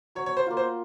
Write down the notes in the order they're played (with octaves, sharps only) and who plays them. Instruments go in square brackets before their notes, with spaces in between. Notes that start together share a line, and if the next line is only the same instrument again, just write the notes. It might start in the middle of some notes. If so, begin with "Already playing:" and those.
[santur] F#3 [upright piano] C#5
[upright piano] C#5
C5
[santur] A#3 F4
[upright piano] C5